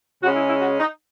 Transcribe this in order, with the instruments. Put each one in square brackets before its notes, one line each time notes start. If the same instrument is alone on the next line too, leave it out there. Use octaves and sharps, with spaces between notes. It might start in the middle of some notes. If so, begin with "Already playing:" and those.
[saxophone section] C#3 G#3 C#4 F#4
E4
E4
F#4
D#4